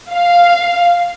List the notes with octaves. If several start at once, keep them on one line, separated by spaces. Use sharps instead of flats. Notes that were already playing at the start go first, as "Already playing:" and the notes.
F5